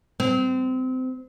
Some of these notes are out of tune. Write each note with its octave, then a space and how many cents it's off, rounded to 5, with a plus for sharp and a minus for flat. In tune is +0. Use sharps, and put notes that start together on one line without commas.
C4 -25